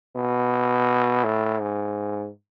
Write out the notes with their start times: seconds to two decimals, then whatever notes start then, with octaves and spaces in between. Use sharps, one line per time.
0.16 B2
1.24 A2
1.60 G#2